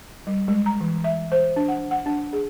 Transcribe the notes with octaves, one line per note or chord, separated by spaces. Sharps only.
G3
G#3
A#5
E3
E5
C5
D4
F#5
F#5
D4
G#4